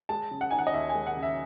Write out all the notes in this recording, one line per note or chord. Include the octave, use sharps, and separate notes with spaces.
G#3 A5
C#3
F#5
D#4 G#5
F#5
D#5
D#2 E5
G#5
G#3
F#5
C#3
E5